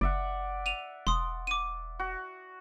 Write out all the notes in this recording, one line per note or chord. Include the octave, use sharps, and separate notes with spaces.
F#1 D5 E5 F#5
D#7 F7
E1 C6 D#6
D6 D#7
F#4